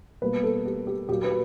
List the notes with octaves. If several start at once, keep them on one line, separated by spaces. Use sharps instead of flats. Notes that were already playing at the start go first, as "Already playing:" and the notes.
B2 G3 A#3 B4
A4
G4
G4
A#2 F#3 A#3 G4
B4